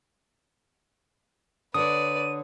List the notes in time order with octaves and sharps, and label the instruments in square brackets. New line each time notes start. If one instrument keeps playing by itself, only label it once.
[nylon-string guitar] D3 C#5 [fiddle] B4 D5 [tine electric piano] D#6 [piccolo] D#7